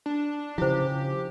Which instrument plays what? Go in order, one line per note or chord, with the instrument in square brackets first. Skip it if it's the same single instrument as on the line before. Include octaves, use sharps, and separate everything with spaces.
[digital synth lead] D4
[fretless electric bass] C#3 F3 [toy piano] E4 C5 [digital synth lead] G4